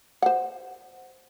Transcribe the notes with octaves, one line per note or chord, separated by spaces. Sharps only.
C5 F#5